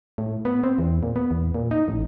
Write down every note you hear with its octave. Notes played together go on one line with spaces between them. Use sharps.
A2
B3
C4
E2
A#2
B3
E2
A#2
D#4
A1